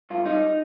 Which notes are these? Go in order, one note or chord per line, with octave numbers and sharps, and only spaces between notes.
G2 F4
G3 D#4